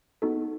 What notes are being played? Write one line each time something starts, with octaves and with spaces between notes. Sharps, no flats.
B3 D#4 F#4 A4